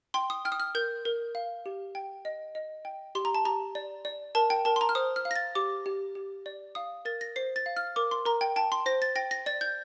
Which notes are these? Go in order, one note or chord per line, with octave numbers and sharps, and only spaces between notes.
G5 C6
D#6
G5 F6
D#6
F6
A#4 G6
A#4
F5
G4
G5
D#5
D#5
G5
G4 C6
A#5
A5
G4 A#5
D5
D5
A#4 A5
G5
A#4 A5
C6
A#5
F6
C5 D#6
F6
F5
A#6
A6
G4 D6
G4
G4
D5
F5 D#6
A#4 A6
A#6
C5 C7
A6
F5
F6
A#4 D6
C6
A#4 A#5
G5
G5 A5
C6
C5 A#6
A6
G5 A#6
A#6
D5 A6
G6